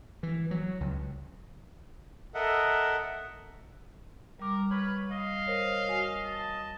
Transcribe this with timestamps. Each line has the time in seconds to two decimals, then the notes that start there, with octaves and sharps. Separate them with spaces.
0.23 E3
0.51 F#3
0.81 C#2
2.34 A4 A#4 D#5 E5 F#5
4.40 G3 A#4 D6
4.71 B4 C#5 B5 F6
5.10 D#5 F5
5.47 A#4 C5 C#5
5.88 F#4 G#5
6.25 A5